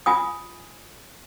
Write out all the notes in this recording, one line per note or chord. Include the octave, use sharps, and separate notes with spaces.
F4 G#5 D#6